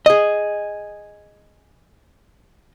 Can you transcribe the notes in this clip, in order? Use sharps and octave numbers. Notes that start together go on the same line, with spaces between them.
G#4 D#5